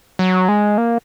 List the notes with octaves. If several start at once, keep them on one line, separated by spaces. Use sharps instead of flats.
F#3
G#3
A#3